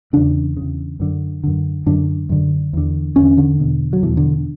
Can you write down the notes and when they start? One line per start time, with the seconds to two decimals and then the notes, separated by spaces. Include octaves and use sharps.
0.13 E2 C#3 D4
0.57 E2 C#3
1.00 F#2 D3
1.44 F#2 D3
1.86 F#2 D3 D4
2.29 F#2 D3
2.73 E2 D3
3.16 E2 D3 C#4
3.38 D3
3.60 E2 B2
3.93 F#3
4.03 E2 B2 E3
4.17 D3